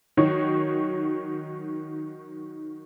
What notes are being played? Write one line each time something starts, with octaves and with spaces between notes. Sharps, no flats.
D#3 F#3 D#4 F#4 C#5